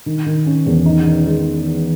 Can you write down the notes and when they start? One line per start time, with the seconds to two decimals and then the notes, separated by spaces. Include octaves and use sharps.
0.06 D#3
0.26 D#3
0.46 C#4
0.66 E2
0.86 D#4
1.06 D#3
1.25 G#3